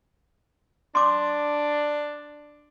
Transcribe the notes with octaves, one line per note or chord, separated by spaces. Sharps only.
D4 C6 D6